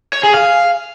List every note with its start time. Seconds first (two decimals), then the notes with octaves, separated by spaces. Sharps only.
0.13 C#5
0.23 G#4
0.34 F5